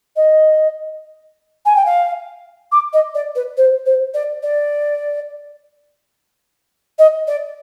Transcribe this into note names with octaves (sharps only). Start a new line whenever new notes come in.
D#5
G#5
G5
F5
D6
D#5
D5
B4
C5
C5
D5
D5
D#5
D5